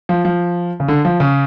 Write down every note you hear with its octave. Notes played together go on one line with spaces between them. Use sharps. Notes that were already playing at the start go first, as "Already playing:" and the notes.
F3
F3
C#3
D3
F3
C#3